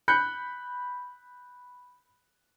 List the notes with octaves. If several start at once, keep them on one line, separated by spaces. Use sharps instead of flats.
B5 F#6 G6 C#7